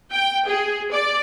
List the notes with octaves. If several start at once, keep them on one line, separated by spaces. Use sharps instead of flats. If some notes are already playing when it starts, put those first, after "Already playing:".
G5
G#4
D5